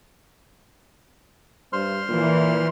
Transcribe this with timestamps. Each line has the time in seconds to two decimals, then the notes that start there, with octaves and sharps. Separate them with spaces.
1.73 G2 C5 C6 F6
2.08 A#2 E3